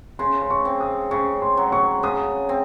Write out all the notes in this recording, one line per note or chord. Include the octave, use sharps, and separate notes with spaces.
C#3 C6
C6
C#6
C4
D#6
C#3 C#6
C6
F#3
C#6
C#3 D#6
C4